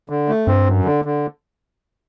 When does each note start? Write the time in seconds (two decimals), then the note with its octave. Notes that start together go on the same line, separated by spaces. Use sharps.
0.10 D3
0.28 A3
0.47 G2 C4
0.66 F#2
0.85 D3
1.05 D3